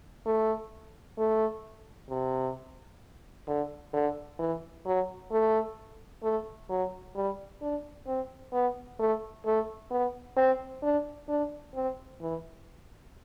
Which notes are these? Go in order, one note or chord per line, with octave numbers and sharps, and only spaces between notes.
A3
A3
C3
D3
D3
E3
F#3
A3
A3
F#3
G3
D4
C4
B3
A3
A3
B3
C4
D4
D4
C4
E3